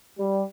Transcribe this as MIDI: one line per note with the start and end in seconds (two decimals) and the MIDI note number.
0.18 0.42 55